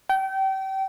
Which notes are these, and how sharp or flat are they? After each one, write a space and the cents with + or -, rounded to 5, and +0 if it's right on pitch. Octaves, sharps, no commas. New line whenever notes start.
G5 -30